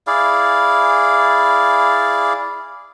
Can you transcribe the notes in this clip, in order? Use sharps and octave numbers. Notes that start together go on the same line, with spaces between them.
E4 G#4 D5 F5